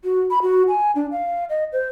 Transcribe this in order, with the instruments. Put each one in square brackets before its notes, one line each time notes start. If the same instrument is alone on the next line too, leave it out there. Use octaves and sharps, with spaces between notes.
[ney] F#4
B5
F#4
G#5
D4
F5
D#5
C5